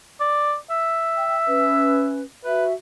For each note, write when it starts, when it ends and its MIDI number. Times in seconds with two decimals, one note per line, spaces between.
0.20 0.56 74
0.70 2.19 76
1.14 1.36 79
1.47 2.22 61
1.47 2.22 71
2.44 2.74 66
2.44 2.65 71
2.44 2.74 76